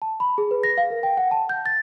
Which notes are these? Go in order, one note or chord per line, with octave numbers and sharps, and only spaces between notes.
A5
B5
G#4
B4
A#6
F5
A#4
G5
F#5
A5
G6
A6